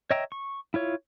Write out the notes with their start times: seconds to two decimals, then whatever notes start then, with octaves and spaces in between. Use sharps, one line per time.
0.11 C#5 D#5 E5 G5 A#5
0.32 C#6
0.74 E4 F4 C#5